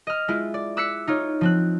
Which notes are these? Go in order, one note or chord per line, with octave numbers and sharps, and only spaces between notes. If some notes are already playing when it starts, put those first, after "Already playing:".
D#5 F6
G#3 E4 F4
D5
D6 E6 F#6 B6 C#7
D#4 F4 C#5
F3 C4 F#6